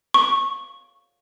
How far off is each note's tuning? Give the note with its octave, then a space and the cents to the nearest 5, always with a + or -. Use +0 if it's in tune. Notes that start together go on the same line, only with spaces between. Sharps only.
C#6 -15